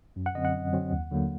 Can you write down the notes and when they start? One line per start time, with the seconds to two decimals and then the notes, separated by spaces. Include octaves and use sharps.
0.16 F#2
0.26 F#5
0.35 D3 F#3 C4 D#5
0.45 F#5
0.54 F#2
0.73 D3 F#3 C4
0.92 D#2
1.11 D3 F#3 A#3